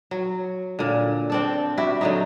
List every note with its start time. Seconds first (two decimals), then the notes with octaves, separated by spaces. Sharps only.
0.11 F#3
0.79 A#2 D3
1.30 C4 D4 A4
1.78 E4 F#4 G4 E5
2.01 D3 F#3 D#4